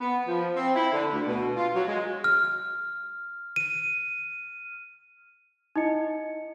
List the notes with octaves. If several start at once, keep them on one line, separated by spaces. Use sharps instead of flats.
B3
F3
C4
E4
D3
D2
B2
F4
F#3
G#3
F6
D#7
D#4 E4 D#5 C#7